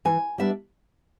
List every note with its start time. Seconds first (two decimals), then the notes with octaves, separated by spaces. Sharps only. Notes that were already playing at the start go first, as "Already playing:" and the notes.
0.05 E3 G#5
0.38 G3 B3 D4 E5